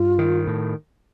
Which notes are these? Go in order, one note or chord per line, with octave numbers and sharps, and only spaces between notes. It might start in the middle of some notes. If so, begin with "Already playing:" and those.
Already playing: G2 F4
D#3
A2